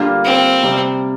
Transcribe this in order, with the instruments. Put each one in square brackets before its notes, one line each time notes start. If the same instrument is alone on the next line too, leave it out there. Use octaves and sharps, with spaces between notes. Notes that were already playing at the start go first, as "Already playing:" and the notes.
Already playing: [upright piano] D3 G3 A#3 F4
[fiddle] C4
[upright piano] C3 G3